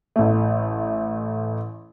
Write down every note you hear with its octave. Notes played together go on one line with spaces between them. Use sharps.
A1 A3